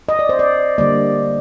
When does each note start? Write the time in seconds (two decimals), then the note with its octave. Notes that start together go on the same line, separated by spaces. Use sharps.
0.09 D#5
0.19 D5
0.29 C5
0.39 D5
0.78 D3 G3 A#3 D5